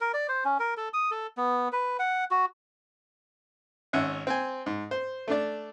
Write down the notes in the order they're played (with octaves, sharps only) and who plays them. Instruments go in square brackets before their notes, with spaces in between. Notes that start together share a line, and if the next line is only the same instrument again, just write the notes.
[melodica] A#4
D5
C5
C#4
A#4
A4
D#6
A4
B3
B4
F#5
F#4
[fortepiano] G#1 C#4 E5 F#5
C4 C5 G#5
G#2
C5
A3 D4 D5